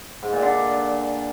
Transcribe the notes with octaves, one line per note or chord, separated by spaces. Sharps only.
G#2
A#2
D3